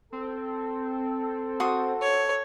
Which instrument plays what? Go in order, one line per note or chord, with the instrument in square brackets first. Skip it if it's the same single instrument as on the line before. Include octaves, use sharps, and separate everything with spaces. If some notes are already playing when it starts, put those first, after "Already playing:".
[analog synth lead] C4 [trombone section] A4
[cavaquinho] F#4 C5 D#6
[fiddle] C#5